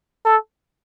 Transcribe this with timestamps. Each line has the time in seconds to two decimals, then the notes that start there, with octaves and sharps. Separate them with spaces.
0.25 A4